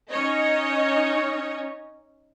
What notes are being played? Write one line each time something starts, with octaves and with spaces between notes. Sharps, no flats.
C#4 D#4 C#5 D#5